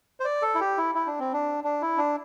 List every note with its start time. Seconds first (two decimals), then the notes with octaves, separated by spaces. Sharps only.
0.20 C5
0.25 D5
0.42 A4
0.55 E4
0.60 G4
0.78 E4
0.95 E4
1.07 D4
1.20 C4
1.33 D4
1.64 D4
1.82 E4
1.98 D4